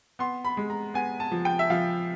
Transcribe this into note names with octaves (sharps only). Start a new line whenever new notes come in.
B3 C6
B5
G#3
A#5
B3 G#5
A5
F3
G5
E5
F3 F5